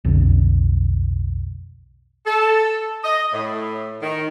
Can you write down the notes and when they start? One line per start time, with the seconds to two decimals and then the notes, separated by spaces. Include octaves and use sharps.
0.05 B1 F2 D3
2.26 A4
3.04 D#5
3.33 A2
4.02 D#3